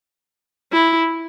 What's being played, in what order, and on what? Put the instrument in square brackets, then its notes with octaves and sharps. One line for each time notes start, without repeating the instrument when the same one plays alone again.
[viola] E4